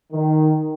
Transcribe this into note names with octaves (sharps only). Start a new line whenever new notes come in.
D#3